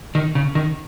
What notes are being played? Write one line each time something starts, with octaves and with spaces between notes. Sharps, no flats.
D#3
C#3
D#3